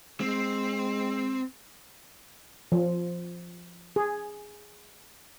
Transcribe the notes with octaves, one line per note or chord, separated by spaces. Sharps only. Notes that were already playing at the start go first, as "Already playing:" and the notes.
G#3 C4
F3
G#4